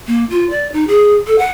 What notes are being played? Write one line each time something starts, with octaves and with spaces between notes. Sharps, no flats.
A#3
F4
D5
D#4
G#4
A4
F#5